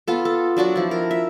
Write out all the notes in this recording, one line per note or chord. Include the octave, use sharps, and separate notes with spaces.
B3 F4 A4
A4
F#3 D4 F#4 D5
F3 E4
A#4
E5